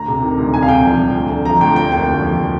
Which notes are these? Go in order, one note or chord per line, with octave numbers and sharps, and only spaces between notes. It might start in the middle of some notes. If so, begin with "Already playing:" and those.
Already playing: D2 A#5
C3
D#3
D2
C2 G#5
F5
C3 G5
F3
C2
D2
D3
F3 A#5
D2 G5
F1 G5
D#2 G5
D3
F3